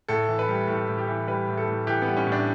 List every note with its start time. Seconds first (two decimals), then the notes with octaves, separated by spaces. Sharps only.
0.08 A2 A4
0.28 E3
0.39 B4
0.49 G3
0.68 A2 A4
0.88 A2
0.98 G4
1.07 E3
1.27 G3 B4
1.48 A2
1.57 A4
1.68 A2
1.87 E3 G4
2.02 B3
2.07 G3
2.17 C#4
2.27 A2
2.32 D4